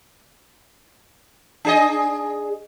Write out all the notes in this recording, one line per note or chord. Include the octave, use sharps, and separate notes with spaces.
D4 G#4 D#5